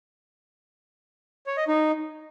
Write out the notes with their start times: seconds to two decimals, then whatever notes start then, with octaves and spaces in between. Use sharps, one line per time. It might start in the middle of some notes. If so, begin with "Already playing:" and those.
1.47 C#5
1.57 D#5
1.68 D#4